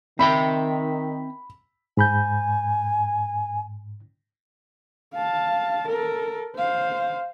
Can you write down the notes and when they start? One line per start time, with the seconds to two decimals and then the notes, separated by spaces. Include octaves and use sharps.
0.19 D#3 C4 E5 G5 B5
1.97 G#2 G#5 B5 G6
5.14 F5 A5
5.88 A4 A#4
6.56 C5 F5